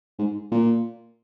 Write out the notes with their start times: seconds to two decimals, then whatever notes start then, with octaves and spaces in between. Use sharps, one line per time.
0.19 G#2
0.51 A#2